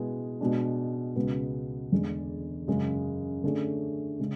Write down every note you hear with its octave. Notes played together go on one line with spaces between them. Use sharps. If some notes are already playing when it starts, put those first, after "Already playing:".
Already playing: B2 G#3 B3 E4 G#4
B2 G#3 D4
C#2 B2 G#3 B3
E2 D3 G#3
F#2 C#3 G#3
D3 A3 C#4 G#4
C#3 G#3